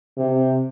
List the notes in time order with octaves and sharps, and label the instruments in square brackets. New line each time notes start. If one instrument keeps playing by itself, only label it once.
[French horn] C3